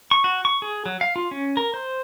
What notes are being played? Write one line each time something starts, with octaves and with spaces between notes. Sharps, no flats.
C#6
F#4
C#6
G#4
F#3
F5
F4
C#4
A#4
C5